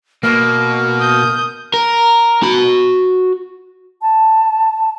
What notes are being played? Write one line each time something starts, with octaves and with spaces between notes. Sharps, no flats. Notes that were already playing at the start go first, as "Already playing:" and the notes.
B2 A#3 F6
D#6 G6
A#4
F#4 B5
A5